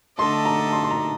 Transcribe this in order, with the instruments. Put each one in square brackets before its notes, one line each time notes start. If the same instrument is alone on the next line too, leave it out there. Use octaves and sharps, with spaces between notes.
[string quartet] D3 A3 D4 A4 D#5 [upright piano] C6
[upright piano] A#5
C6
C6
A#5